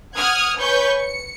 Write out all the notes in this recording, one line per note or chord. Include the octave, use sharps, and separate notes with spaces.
F#5 D#6 F6 F#6 G#6
B4 C#5 G#5 C#6 G6
C#7